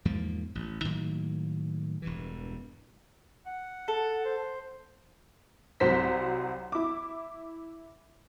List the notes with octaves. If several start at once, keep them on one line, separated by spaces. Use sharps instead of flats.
E2 G#2 F3 A#3
A1
A2 D#3 F#3 A#3
E1 G2 E3
F#5
A4
C5
C2 F#3 C5 B6
E4 D6